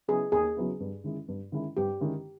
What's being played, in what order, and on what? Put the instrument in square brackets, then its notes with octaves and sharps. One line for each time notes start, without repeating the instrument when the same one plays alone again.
[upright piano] C#3 F#3 B3 E4 [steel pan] G#4
[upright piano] D#2 [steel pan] G#4
[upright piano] C#3 F#3 B3 E4
G2
D#3 G#3 C#4 E4
G2
D#3 G#3 C#4 E4
[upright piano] G2 [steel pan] G4
[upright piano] D#3 G#3 C#4 E4